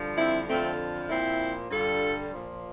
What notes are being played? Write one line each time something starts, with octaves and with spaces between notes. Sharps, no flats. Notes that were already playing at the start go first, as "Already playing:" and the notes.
Already playing: G2 D3 F3
C4 E4
F2 D3 F3 A3 C4
A#2 F3 C4 E4
G2 D3 G3 F4 A4
A#2 F3